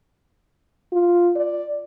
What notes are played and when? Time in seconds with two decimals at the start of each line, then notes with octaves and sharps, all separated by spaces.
0.92 F4
1.36 D5